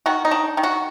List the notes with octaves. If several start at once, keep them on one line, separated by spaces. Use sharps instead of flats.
D#3 F#4
D#4
D4
D#3
F#4